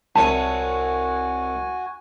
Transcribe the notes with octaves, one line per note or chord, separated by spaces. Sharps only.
C2 F#4 C#5 G#5 A5